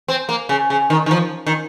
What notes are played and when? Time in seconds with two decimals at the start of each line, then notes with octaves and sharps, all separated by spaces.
0.08 C4
0.29 A#3
0.49 C#3
0.70 C#3
0.90 D#3
1.06 D#3
1.11 F3
1.47 D#3